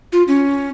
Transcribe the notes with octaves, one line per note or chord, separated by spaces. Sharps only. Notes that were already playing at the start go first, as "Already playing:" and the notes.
F4
C#4